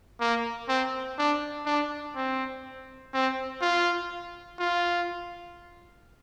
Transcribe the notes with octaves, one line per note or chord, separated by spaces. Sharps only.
A#3
C4
D4
D4
C4
C4
F4
F4